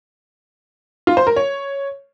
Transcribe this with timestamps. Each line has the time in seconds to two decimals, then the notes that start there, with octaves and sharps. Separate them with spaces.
1.07 F4
1.17 C5
1.27 A#4
1.36 C#5